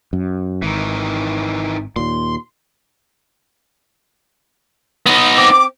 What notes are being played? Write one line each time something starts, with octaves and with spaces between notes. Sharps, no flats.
F#2
G#1 D#3 E3
D#2 A#2 C6
B3 D#4
C4 D6